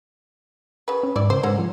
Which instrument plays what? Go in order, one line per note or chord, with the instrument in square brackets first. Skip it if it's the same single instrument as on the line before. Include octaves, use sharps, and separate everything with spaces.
[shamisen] C#3 B4
[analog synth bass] C#4
[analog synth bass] G#2 [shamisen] E4 D5
[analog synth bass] C#3 [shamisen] C5
[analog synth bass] G#2 [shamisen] C4 C#4 F#5
[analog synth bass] F3